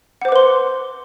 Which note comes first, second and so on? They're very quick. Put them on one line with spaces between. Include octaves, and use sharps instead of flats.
F#5 C5 D6 B4 C6